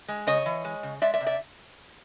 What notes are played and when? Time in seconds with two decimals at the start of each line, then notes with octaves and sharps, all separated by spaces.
0.08 G#3
0.27 C#3 C#5 D#5
0.45 E3
0.65 G#3
0.83 C#3
1.02 G#3 D5 E5
1.14 D5 E5
1.21 C3
1.27 D5 E5